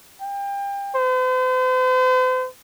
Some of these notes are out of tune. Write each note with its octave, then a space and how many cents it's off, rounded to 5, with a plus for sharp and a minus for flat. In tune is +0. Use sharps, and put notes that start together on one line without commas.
G5 +30
C5 -45